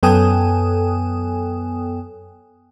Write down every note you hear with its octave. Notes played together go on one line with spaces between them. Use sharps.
F#2 B3 A4 G5 G#5 D#6